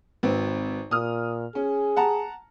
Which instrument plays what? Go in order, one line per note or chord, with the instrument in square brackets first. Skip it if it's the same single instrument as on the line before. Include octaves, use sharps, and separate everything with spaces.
[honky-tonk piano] G#1 C4 B4
[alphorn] A#2 [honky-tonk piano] D#6 F6
[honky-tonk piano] C#4 [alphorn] G#4
[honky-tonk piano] F#5 A5 A#5